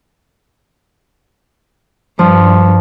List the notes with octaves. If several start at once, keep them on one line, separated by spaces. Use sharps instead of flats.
G2 F3